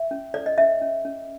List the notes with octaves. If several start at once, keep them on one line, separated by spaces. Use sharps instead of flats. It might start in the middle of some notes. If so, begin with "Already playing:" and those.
Already playing: E5
C#4
A4 D5
D#5
C#4 E5
C#4
C#4